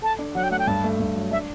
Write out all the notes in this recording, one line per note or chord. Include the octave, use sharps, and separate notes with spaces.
A4 A5
D4
F#3 F#5
G5
A3 F#5
G5
G2 A5
A3
G2
F#3
D4 E5